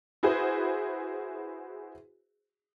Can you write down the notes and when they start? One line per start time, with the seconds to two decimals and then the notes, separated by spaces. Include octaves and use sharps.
0.23 E4 F#4 G#4 B4 C5